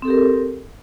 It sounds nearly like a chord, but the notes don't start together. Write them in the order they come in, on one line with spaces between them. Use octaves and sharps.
C4 A4 G4 A#4